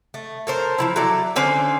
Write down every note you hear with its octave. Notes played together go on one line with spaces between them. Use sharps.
A3
A4 A#4 C5
F3 G3 E4
F#3 E4 A4 D5
D3 C#4 C5 D5